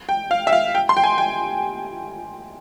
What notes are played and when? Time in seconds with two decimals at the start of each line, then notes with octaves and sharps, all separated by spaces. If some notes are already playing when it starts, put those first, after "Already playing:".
0.09 G5
0.31 F5
0.47 E5
0.53 F5
0.75 G5
0.89 C6
0.97 G5
1.04 G#5
1.18 G5